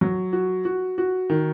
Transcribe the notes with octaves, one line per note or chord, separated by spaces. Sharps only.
F#3
F#4
F#4
F#4
D#3